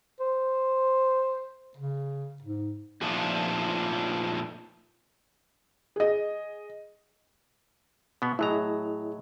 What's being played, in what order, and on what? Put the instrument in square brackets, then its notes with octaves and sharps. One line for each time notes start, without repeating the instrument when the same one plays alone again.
[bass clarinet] C5
C#3
G#2
[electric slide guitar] F2 A#2 F3 A3 D4 D#4
[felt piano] G#4 D#5
[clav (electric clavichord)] B2 B3
[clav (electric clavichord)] A2 F#3 A#5 [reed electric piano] E4 G#4 D#5